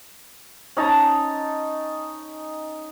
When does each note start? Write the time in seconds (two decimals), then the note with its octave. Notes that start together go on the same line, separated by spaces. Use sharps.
0.77 C#4 D#4 A5 A#5